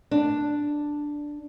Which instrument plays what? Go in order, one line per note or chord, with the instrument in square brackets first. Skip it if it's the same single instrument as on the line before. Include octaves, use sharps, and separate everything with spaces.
[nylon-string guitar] D4